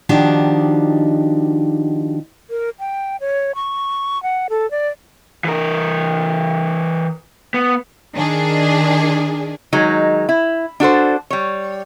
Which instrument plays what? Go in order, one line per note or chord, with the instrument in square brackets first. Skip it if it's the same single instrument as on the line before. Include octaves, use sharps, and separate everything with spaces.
[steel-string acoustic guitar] D#3 F3 D4 D#4 F#4 G4
[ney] A#4
G5
C#5
C#6
F#5
A4
D5
[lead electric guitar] E3 A#4
B3
[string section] D#3 D4 G#4
[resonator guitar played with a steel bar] D#3 F#3 G#3 D#4
E4
D4 F#4 A4 C5
G3 C#5